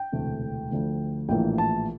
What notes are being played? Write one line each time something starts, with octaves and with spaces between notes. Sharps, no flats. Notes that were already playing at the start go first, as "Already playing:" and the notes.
Already playing: G5
E1 D2 C3 E3 A3
D2 D3 F3 A3
A#1 A2 E3 A#3 G5
A5